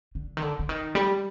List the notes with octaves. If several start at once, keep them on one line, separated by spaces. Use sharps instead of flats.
D3
D#3
D3
D3
D#3
G3